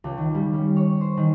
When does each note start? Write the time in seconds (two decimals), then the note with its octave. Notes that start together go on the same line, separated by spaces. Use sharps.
0.04 C#2
0.18 D#3
0.35 G3
0.53 C#4
0.77 C#5
1.01 C5
1.17 D#3